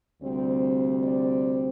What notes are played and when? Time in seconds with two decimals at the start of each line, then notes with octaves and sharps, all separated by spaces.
0.22 D2 C3 G3 C4
1.04 D5